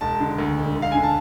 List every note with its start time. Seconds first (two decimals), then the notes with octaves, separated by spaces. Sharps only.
0.01 E1 A5
0.20 D3
0.38 D2
0.57 E1
0.76 D2
0.82 F5
0.92 D3 G#5
1.03 A5